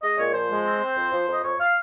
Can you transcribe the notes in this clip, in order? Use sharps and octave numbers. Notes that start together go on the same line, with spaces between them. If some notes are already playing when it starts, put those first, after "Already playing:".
G#3 D#5
A#2 C#5
F3 C5
G#3
C4
C4
F2
F3
F2
D#5
F2 C#5
F5